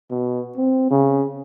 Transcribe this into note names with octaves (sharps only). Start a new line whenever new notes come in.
B2
C4
C#3